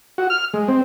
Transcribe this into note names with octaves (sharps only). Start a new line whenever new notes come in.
F#4
F6
G#3
C4